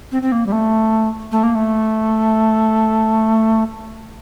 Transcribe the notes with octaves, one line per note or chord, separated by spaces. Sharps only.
C4
C4
A#3
G3
A3
A3
A#3
A3